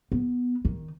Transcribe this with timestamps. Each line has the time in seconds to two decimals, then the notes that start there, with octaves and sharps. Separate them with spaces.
0.12 B3
0.65 D#3